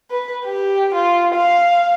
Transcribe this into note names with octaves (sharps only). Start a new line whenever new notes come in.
B4
G4
F4
F5